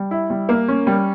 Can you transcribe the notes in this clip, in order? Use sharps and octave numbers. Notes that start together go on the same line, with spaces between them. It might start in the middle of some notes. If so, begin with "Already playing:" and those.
Already playing: G3
E4
G3
A#3
C#4
G3